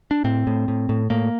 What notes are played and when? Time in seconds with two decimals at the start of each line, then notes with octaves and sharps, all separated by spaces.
0.11 D4
0.24 A2 C4
0.47 A2
0.68 A2
0.89 A2
1.10 A2 A#3